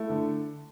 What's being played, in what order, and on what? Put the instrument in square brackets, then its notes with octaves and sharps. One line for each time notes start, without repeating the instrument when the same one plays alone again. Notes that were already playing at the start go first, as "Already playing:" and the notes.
Already playing: [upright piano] A3 [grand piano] E4
[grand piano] D3